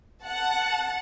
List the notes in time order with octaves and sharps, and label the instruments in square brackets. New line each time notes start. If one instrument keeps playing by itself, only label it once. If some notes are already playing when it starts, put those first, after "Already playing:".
[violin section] F#5 A5